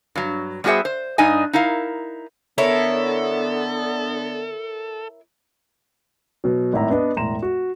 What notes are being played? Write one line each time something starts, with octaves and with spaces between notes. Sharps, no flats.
G2 F#3
G3 B3 F#4 G#4 C5 E5
C5
G2 D4 D#4 D#5 G#5
D#4 E4 A#4 F5
D3 B3 E4 A4 A#4 C#5
B2 F#3
G#1 A2 E4 E5 A#5
B3 D4 D#5
E1 A2 A#5 C6 E7
F#4